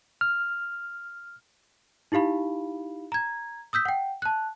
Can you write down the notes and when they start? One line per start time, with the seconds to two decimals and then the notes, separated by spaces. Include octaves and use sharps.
0.21 F6
2.12 D#4 E4 G4 F5 B5
3.12 A#5 G#6
3.73 D#6 E6 G6 B6
3.85 F#5 G5
4.22 A5 F#6